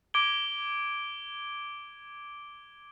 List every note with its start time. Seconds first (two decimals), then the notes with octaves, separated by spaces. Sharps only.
0.14 D6 G#6 D7 G7